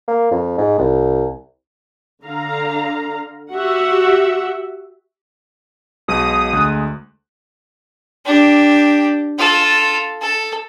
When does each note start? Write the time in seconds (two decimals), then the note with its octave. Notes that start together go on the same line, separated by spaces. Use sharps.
0.08 A#3
0.31 F2
0.58 G#2
0.78 C2
2.25 D3 F5 A#5
3.53 F#4 G4 E5 F#5
6.08 B1 B2 G#3 D#6
6.53 D2 G#3 F#6
8.26 D4 G4
9.38 F4 A4
10.21 A4